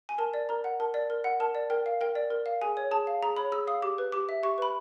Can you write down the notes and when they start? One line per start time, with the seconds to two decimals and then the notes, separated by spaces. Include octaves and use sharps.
0.09 G#5
0.18 A#4 A5
0.34 D5
0.49 A#4 A#5
0.64 F#5
0.80 A#4 A5
0.94 D5
1.10 A#4
1.24 F#5
1.40 A#4 A5
1.55 D5
1.70 A#4 G5
1.86 F5
2.01 A#4 G5
2.15 D5
2.30 A#4
2.46 F5
2.62 G#4 G#5
2.77 C#5
2.91 G#4 A5
3.07 F5
3.23 G#4 A#5
3.37 C#5 B5
3.52 G#4 E6
3.67 F5 D#6
3.82 G4 D6
3.98 B4
4.12 G4 D6
4.29 E5
4.43 G4 C#6
4.58 B4 B5